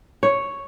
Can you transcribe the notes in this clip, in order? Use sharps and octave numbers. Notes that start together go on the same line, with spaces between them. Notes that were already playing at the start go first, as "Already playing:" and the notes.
C#5